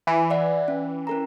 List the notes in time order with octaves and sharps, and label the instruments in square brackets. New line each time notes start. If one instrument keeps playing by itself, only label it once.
[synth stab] E3
[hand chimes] D5 E5 F#5
C#4
C#4 A#4 A#5